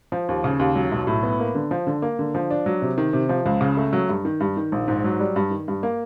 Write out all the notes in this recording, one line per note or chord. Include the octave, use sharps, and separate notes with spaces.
F3
D#2
C#3
D#2
F#3
B1
A2
B3
A#3
D3
F3
D3
A#3
D3
F3
D4
F#3
C3
D#3
C3
F3
C#2
C#3
A3
F#3
G2
D#3
G2
D#3
A#1
G#2
F#3
G3
G2
D#3
G2
A#3